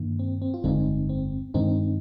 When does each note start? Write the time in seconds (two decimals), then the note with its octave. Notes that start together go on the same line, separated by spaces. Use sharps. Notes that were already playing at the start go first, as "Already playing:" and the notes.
Already playing: G2 D#3 A#3 D4
0.19 C4
0.42 C4
0.54 F4
0.64 G1 F2 D3 G#3 C4 D#4
1.09 C4
1.54 G2 D#3 G#3 C4 D4 D#4